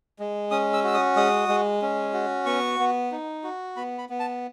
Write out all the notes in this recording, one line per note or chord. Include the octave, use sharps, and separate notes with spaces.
G#3
C#4 D#6
E6
F#4 E6
D#6
G#3 D#6
G#3
C#4
F#4
B3 C#6
B3
D#4
F#4
B3 B5
B5
B3
A5